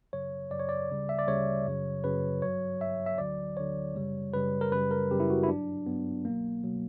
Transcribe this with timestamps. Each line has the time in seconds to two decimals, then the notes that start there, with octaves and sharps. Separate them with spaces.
0.13 F#2 C#3 F#3 C#5
0.50 F#2 C#3 F#3 D5
0.60 C#5
0.69 D5
0.89 D2 C#3 G3
1.09 E5
1.19 D5
1.27 D2 C#3 G3 C#5
1.66 F#2 C#3 F#3
2.03 F#2 C#3 F#3 B4
2.42 G2 F#3 C#5
2.80 G2 F#3 E5
3.06 E5
3.18 D2 D3 F#3 D5
3.57 D2 D3 F#3 C#5
3.95 F#2 C#3 G3
4.33 F#2 C#3 G3 B4
4.61 A#4
4.72 F#2 C#3 G3 B4
4.91 A#4
5.11 F#2 C#3 G3 G4
5.20 E4
5.30 F#4
5.43 E4
5.48 G2 F#3 D4
5.86 G2 F#3 B3
6.25 C#2 B2 F#3 A#3
6.64 B2 F#3